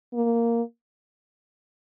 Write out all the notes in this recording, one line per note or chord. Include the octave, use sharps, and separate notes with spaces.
A#3